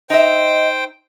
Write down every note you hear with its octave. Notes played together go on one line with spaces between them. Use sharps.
D#4 C5 D#5 E5 G5